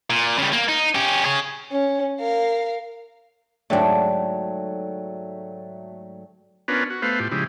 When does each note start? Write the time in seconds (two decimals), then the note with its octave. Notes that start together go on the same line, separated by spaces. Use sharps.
0.10 A#2
0.38 C#3 G3
0.53 A#3
0.68 D#4
0.95 C#4 G4
1.25 G#4 C#5
1.72 C#4
2.20 A#4 F5
3.70 G#2 D3 F#3 A3 D4 C#5 D5 G5
6.68 B3 C#4 D4 F4 A#4 B4
6.90 F#4
7.02 A3 B3 B4 C5 F5
7.20 A2 F4 G4
7.31 C#3 F3 G#3 E4 G4